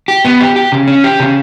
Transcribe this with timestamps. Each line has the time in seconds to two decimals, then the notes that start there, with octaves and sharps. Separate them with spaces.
0.08 G4
0.25 B3
0.41 G4
0.56 G4
0.72 C#3
0.87 C#4
1.04 G4
1.20 C#3